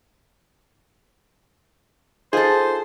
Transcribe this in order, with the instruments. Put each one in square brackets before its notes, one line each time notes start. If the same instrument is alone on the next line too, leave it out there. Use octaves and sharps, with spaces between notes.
[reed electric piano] D#4 F4 [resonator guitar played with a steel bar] G#4 A4 [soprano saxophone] C5